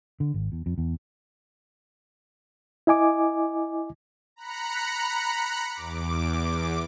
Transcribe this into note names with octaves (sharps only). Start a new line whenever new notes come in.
D3
G#1
E2
F2
E2
E4 D#5 G#5 D6
A#5 B5 F#6 C#7
E2 D6